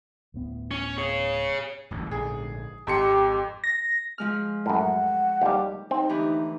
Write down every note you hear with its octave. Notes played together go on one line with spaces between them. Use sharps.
D1 A2 B3
C#4
G#4 C#5
D1 A1 G2
A#1 G#2 D3 G#4
G#1 F2 G4 C6 C#7
A#6
F3 G#3 F6
F#2 A2 F#5
D#2 G3 G4
C4 D#4
D2 E3 G4